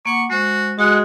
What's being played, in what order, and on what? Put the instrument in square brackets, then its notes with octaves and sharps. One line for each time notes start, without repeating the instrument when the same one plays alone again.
[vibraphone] A#3 F#5 D6 [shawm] C#6
[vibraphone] G#3 C5 [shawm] F#4
[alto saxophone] G#3 [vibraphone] F#4 [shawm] F#5